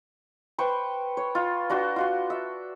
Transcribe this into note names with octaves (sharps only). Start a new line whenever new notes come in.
B4 C5 G5 C#6
C#5
F4
D4 F#4 C6
F4 F#4 C6
E5